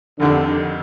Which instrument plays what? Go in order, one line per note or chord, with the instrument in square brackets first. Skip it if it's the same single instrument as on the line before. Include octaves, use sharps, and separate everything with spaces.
[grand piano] F1 F2 D#3 G3 [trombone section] D3